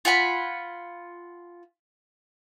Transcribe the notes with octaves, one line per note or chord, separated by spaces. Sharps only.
F4 F#5 G#5 B5